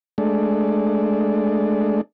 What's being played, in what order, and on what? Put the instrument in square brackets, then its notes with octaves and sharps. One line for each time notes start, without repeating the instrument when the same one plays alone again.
[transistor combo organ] G#3 A3 D4